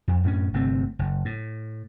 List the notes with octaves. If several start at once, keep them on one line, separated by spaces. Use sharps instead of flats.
F2
F#2 A2 C4 C#4
G1 C3 A3 C4
F#1
A2